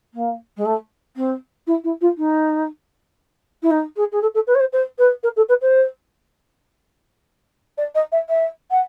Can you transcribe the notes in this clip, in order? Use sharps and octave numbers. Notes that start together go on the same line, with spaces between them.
A#3
G#3
A3
C4
E4
E4
F4
D#4
E4
D#4
G#4
G#4
A4
A4
B4
C#5
C5
C5
B4
A#4
A4
B4
C5
D5
D#5
E5
E5
F#5